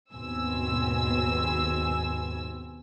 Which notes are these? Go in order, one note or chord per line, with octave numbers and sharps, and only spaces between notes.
D#2 G#2 B2 C4 G#5 E6